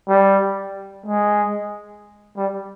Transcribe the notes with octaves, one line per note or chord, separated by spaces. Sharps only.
G3
G#3
G3